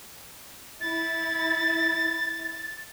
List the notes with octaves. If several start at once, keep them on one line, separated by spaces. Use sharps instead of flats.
E4 A6